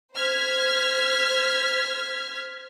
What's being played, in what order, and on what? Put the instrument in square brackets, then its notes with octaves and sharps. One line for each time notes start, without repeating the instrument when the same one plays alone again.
[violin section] C5 F6 G#6 B6